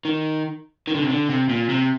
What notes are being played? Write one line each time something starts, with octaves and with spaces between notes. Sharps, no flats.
D#3
D#3
D3
C3
D3
C3
A#2
C3